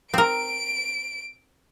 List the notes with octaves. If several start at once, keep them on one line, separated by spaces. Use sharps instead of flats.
C4 A#4 D7